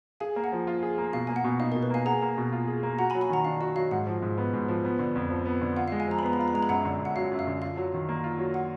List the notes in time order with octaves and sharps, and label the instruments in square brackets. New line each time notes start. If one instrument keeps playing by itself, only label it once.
[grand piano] G#4 [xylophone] F5 G#5
[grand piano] A#3
[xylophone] F#5
[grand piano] F3
F4
G#4
A#3
[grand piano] B2 [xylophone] F5
[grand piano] A#3 [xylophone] G#5
[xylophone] F#5
[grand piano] B2
[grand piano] D#4 [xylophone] F5
[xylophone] A#4
[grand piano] B2
[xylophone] B4
[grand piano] A#3 [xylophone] F5 G#5
[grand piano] G#4 [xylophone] F#5 A#5
[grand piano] A#3
B2
F4
G#4
A#3
[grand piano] F#4 [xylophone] F#5 A#5
[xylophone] G#5 B5
[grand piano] F#3
[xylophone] G#5 B5
[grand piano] D#3 [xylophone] F#5 A#5
[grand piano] D4 [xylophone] F5
[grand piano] F#4 [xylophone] D#5
[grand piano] F#3 [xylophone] F5
[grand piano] G#2 [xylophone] F#5
[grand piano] F3
G#2
B3
G#2
F3
B3
D3
F2
F3
B3
D3
[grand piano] F4 [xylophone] F#5
[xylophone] F5
[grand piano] G#3
[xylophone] F5 G#5
[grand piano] F3 [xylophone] A#5
[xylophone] B5
[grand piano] B3 [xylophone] A#5
[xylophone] B5
[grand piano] F4 [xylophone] A#5
[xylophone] B5
[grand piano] G#3 [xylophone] A#5
[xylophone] B5
[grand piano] F#2 [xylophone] F#5 A#5
[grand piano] D3
F#2
[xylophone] F#5
[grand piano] F#3 [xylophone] F5
[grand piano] F#2
[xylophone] F5
[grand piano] D3
[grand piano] F4 [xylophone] F5
[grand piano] F#3
D#3
A#3
F4
F#3
[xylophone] F#5